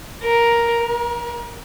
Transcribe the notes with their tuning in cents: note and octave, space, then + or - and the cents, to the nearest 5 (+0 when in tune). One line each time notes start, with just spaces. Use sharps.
A#4 +5
A#4 +35